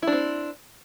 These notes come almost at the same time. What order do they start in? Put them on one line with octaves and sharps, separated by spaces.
E4 D4 C4